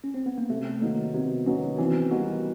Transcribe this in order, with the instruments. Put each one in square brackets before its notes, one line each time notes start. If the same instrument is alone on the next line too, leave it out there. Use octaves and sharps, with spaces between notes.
[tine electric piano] C#4
C4
B3
A#3
[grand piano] C3 [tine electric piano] A3
[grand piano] D#3 F#3 B3 D#4 [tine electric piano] A#3
[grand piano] C3 [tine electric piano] B3
[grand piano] D#3 F#3 B3 D#4 [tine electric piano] C#4
[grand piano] E3 [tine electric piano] C4
[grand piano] G3 A#3 D#4 F#4 [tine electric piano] B3